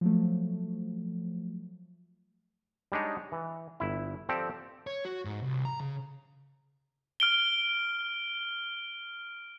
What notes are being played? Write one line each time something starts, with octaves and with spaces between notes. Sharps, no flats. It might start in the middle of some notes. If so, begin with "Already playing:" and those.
F3 F#3 A3
G3 G#3 D4 D#4 C#5
E3
G1 E4
F3 C4 G4 A4 D5
C#5
F#4
G#2
C2
A#5
C#3
F6 D7 G7